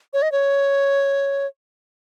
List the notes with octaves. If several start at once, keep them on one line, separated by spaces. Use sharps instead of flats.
C#5
D#5
C#5